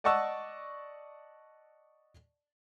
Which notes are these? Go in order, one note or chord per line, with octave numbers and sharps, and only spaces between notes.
D5 D#5 F#5 A5 C#6 E6